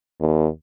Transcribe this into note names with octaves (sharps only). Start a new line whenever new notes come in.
D#2